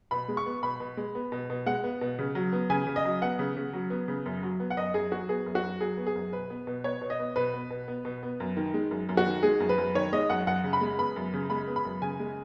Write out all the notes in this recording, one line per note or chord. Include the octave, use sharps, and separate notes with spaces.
B2 B5
G#3
C#6
B3
B2 B5
B2
G#3
B3
B2
B2
G#3 F#5
B3
B2
C#3
F#3
B3
C#3 G#5
C#3
D#5
F#3
B3 F#5
C#3
C#3
F#3
B3
C#3
F#2
F#3
B3
F#5
F#2 D#5
F#2 G#4
F#3 F#4
B3 G#4
F#2
F#4
F#2
F#3 G#4
B3
G#4
F#2
B2 B4
B3
B2
B3 C#5
B2
D#5
B3
B2 B4
B3
B2
B3
B2
B3
F#2
D#3
G#3
F#2
F#2
F#4
D#3
G#3 G#4
F#2
B4
F#2
D#3 C#5
G#3 D#5
F#2 F#5
F#2 F#5
C#3
B5
G#3
B3 B5
F#2
C#3
G#3 B5
B3
B5
F#2
C#3 G#5
G#3